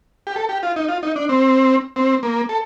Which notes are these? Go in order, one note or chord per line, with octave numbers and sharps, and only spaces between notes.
G4
A4
G4
F4
D#4
F4
D#4
D4
C4
C4
A#3
A4